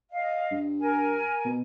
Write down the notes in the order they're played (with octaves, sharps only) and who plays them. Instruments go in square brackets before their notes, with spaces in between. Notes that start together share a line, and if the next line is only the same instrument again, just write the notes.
[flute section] D#5 F5
[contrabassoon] G2
[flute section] A#4 G#5
[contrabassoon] B2